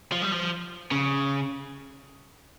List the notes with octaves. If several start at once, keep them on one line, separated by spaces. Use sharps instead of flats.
F3
G3
F3
C#3